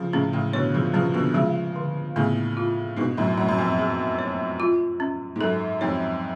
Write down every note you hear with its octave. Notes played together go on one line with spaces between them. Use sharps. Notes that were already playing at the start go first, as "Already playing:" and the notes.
Already playing: C#3 F3
A2 C#3 C#4
A2 C#3
B2 D3 C#5
C#3 F3
C#3 F3 C#4
B2 D3
C#3 F3 G#3
D3
A2 C#3 B3
F4
G#2 B2 D4
F#2 A2
F#2 A3
F#2
F2
G#4
C#5
F4
C#4
G#2
F#2 A4
F2 G#2 C#5